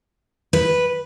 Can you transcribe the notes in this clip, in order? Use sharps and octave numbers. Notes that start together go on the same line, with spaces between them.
B4